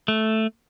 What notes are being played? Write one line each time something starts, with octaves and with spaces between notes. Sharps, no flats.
A3